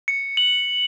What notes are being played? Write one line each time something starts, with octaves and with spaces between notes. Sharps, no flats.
C#7
F#7